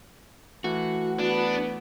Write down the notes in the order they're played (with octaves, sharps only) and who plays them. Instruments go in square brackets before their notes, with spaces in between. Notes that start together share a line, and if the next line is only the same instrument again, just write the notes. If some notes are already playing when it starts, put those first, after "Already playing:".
[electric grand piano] E3 A3 [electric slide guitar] F#4
[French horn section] B3 [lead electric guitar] D4